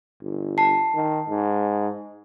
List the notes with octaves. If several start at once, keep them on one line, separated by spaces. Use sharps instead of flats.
G1
A5 C7
D#3
G#2